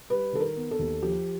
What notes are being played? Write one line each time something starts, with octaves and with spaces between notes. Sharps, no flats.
G3 B4
D#3 A4
A#4
B3
A4
D#2
F3 G4